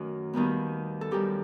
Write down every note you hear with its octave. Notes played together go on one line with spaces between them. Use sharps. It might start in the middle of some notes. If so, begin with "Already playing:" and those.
Already playing: F#2 D#3 A3 F#4
D#2 D#3 G3 B3
A4
F#2 D#3 G3 G4